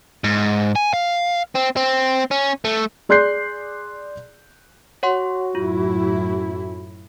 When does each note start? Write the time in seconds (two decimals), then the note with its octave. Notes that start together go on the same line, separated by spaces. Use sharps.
0.24 G#2
0.76 G#5
0.94 F5
1.55 C4
1.76 C4
2.31 C#4
2.65 A3
3.09 G#4 D5 C6 F#6 G6 C7
5.03 F#4 C#5 F#5 C6
5.55 F#2 A2 E4 F4